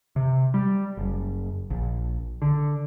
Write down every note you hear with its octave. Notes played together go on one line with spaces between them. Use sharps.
C3
G3
F#1
A#1
D3